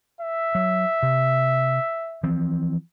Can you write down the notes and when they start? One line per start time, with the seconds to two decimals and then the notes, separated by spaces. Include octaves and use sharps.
0.21 E5
0.55 F#3
1.03 C3
2.23 E3 F3 C4